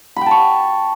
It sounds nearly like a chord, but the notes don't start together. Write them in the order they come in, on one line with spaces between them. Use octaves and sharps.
B5 G5 A5 C#6